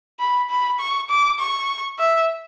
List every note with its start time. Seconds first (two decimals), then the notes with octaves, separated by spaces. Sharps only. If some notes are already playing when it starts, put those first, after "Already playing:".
0.20 B5
0.50 B5
0.79 C#6
1.10 D6
1.39 C#6
1.99 E5